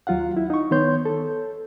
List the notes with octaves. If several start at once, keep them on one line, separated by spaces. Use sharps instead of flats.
D#2 F#3 F4 F5 F#5
E4
D#4 C#6
D#3 B3 C#5 C6 G6
A4